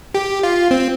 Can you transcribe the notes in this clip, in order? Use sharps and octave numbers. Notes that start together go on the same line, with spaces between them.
G4
F4
C4